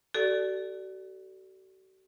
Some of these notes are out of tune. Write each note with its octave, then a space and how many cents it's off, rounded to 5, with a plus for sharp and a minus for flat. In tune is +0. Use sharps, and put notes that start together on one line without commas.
F#4 +45 A4 +0 D5 +0